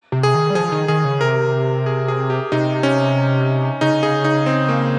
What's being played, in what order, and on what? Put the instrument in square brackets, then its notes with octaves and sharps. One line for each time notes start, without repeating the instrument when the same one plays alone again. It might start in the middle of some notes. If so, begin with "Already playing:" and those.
[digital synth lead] C3
[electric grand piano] G#4
[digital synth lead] D#3
G3
[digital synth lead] F3 [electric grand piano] G#4
[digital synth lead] D#3
[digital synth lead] D#3 [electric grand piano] G#4
[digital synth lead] C#3
[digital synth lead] C3 [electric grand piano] A#4
[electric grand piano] G#4
G#4
G4
[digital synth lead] C3 [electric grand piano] D#4
[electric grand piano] C#4
[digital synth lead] C#3 [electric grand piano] D#4
[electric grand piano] G#4
D#4
C4
A#3